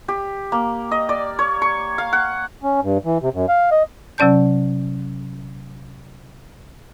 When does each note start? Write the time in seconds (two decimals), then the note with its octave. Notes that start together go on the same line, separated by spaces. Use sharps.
0.08 G4
0.52 A#3
0.91 D#5
1.09 D5
1.39 C#5
1.62 C#6
1.98 F5
2.13 F#5
2.63 C#4
2.83 G2
3.05 E3
3.22 C3
3.34 F#2
3.48 F5
3.71 D#5
4.18 C3 F#3 C#4 D5 A5 G6